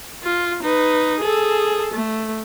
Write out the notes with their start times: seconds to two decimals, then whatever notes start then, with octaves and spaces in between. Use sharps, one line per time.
0.23 F4
0.63 D#4 B4
1.19 G#4 A4
1.94 A3